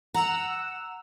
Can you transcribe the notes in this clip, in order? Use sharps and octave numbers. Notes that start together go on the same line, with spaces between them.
F#5 A#5 E6